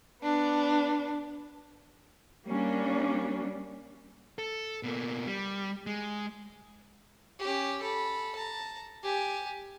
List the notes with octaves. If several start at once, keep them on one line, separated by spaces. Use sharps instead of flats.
B3 D4
G3 A#3 C#4 D4
A4
B2 A#3
G3
G#3
C#4 G4
A4 B5
A5 A#5
G4 G#5